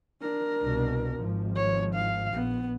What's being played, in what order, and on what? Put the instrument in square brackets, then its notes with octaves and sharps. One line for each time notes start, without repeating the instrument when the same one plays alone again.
[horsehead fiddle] D4 A#4
[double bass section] C2 B2
G#1 F3
[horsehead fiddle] C#5
F5
[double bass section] A#1 [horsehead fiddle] B3